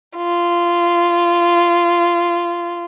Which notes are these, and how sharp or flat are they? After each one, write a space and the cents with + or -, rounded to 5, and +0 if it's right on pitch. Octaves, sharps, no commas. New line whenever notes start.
F4 -15